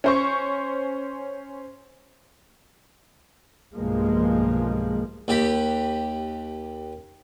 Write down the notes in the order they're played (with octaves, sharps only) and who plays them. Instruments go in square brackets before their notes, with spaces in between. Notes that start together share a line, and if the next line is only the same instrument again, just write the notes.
[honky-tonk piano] C#4 C5 C#6
[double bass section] B1 G2 F3 G#3 A#3
[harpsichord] D#2 G4 B5